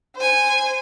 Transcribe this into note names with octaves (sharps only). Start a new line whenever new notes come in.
C5 G#5